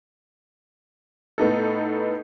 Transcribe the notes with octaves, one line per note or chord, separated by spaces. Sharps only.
A2 B3 D#4 A4